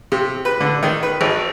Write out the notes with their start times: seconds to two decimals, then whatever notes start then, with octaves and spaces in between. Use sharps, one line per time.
0.12 C3
0.45 B4
0.60 D3
0.83 D#3
1.03 B4
1.21 G#1